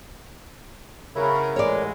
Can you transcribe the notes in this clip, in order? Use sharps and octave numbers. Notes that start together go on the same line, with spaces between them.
C#3 E4 F#4 A#4 B4
A1 G#3 C#5 D5